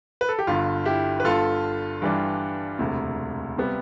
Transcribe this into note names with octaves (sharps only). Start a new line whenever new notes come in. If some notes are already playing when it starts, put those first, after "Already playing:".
B4
A4
G4
G1 G2 D3 F4
E4 G4
B4
G1 G2 D3 F4 A4
G2 E3 G3 D4
E1 D2 C3
C3 G3 B3